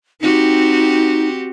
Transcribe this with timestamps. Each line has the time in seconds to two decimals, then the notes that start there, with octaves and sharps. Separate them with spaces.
0.21 C4 D#4 F#4 G4